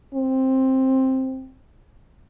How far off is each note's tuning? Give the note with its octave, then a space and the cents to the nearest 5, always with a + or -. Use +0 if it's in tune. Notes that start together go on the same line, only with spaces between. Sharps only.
C4 +10